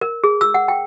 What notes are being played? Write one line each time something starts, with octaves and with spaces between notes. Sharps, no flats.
A#4
G#4
E6
F#5
G5